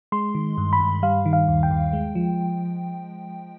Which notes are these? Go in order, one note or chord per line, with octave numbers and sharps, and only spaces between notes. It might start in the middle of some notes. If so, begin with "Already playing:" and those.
G#3 C6
D#3
G2
B5
G2
G3 F5
D#3
F5
D#2
G5
D#2
G#3
F3